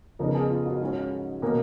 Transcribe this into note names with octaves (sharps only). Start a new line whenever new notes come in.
F2 C#3 F3 B3 D#4 A#4
G#4
F4
F#4
G#2 F#3 C#4
B2 A#3 C#4 A#4